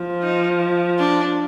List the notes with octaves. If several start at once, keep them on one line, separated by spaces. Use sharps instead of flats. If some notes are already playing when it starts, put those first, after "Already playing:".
Already playing: F3
D#4
D4